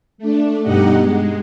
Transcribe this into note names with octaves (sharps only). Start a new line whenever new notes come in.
A3 D4
G2 B2 D#4 G4 D#5 F#5
G#3